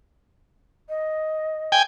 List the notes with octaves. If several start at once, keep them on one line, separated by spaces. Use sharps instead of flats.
D#5
G5 G#5